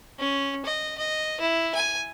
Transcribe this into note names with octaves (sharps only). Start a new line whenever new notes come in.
C#4
D#5
D#5
E4
G#5